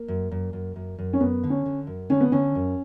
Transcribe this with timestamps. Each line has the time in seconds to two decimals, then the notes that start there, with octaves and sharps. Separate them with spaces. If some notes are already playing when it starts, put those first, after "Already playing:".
Already playing: A#3
0.08 F#2
0.31 F#2
0.53 F#2
0.76 F#2
0.99 F#2
1.13 C#4
1.21 F#2 B3
1.44 D3
1.50 C#4
1.66 D3
1.87 F#2
2.10 D3 C#4
2.21 B3
2.32 D3 C#4
2.55 F#2